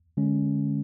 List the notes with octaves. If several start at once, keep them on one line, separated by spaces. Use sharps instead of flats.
D3 G#3 C#4